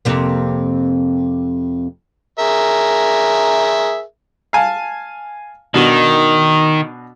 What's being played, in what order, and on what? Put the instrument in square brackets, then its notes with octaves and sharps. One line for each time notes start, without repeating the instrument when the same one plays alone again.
[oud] F2 C3 A#3
[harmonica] G#4 A#4 E5
[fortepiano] F5 G#5 A5
[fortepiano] B2 D4 F#4 [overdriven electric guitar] D#3